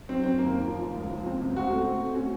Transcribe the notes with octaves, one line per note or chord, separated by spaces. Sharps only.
F#3 C4
F#2 C4
D#2 A#3
D#2
F3
D#2
C#2
F3
C4
C#2
C4 F#4
A3
C4
A3
C#4 F#4